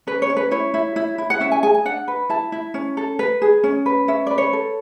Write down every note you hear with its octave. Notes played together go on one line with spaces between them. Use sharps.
C#4 B4
C#5
C#4
B4
E4 C#5
E4
E4
E4
F#5
C#4 E5
G#5
G#4 G#5
G#5
D4 F#5
B4
E4 A5
E4
C#4
A4
B4
G#4
C#4
B4
C#4 E5
B4 D5
C#5
A4